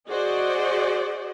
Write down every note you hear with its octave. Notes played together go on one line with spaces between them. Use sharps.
F#4 G#4 C5 D5 D#5